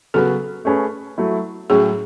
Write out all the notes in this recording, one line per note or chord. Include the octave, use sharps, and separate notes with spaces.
C#3 F#3 B3 F#4 A4 B4
A3 C#4 G#4 B4
F#3 A3 E4
A2 F#3 C#4 G#4